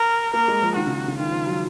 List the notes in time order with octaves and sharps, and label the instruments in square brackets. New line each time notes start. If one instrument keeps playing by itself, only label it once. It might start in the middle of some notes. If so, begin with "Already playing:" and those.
Already playing: [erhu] A#4
[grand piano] A#3 [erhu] A#4
[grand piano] G#3
F3
[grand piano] D#3 [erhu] F#4
[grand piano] C#3
C#3
[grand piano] D#3 [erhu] F4
[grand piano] F3
F#3